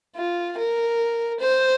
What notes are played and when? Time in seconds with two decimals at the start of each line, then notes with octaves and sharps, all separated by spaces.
0.16 F4
0.58 A#4
1.41 C5